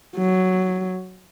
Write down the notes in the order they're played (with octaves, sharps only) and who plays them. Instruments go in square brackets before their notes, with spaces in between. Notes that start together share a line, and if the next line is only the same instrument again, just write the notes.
[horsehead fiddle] F#3